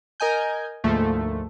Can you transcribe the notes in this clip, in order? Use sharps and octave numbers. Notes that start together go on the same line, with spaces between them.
A#4 D#5 G#5 G6
D2 G#2 F3 A3 A#3